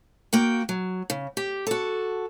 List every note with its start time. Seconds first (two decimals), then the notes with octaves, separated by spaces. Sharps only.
0.33 A#3 F#4 G5
0.69 F#3
1.10 C#3
1.37 G4
1.67 F#4 A4